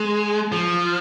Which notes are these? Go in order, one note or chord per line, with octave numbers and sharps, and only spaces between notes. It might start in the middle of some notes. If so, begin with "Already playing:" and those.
Already playing: G#3
F3